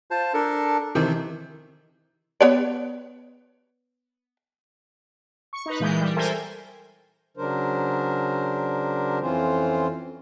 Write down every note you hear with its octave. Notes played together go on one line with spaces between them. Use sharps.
F4 C5 A5
D4 A4 A#4
C3 D#3 E3 C5
B3 C#5 D5
C#6
D#4 B4
A#2 E3 G#3 G6
G3
A4 A#4 C5 E5 G5 G#5
C#3 F#3 D4 A#4 C5
F2 E3 C4 C#4 F4 C5